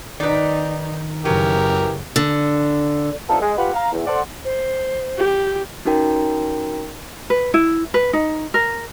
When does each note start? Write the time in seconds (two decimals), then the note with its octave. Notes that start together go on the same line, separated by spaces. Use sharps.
0.20 D#3 D#4 B4 D5
1.25 F#2 C#3 E3 F#3 G4 A#4
2.16 D3
3.29 C3 B3 D4 D#4 F4 A4
3.41 G#3
3.57 F4 G4 B4 F#5
3.74 F5 A#5
3.92 E2
4.07 A4 C5 D5 F#5
4.45 C5
5.18 G4
5.85 C#4 D#4 F#4 A#4 G5 A#5
7.30 B4
7.54 E4
7.94 B4
8.13 D#4
8.54 A#4